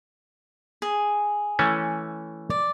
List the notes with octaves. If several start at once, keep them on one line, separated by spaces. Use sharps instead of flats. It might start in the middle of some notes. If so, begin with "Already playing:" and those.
G#4
E3 A3 C#4
D5